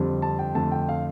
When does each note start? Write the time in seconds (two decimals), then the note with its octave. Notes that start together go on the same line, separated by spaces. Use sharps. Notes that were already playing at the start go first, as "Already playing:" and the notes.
Already playing: F2 D3 G3 C4
0.22 A5
0.39 G5
0.55 F2 D3 A3 A5
0.72 G5
0.89 F5